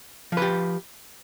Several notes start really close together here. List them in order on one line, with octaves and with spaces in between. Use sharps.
F3 B4 G4